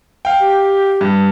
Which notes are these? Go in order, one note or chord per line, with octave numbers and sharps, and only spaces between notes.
F5 G5
G4
G2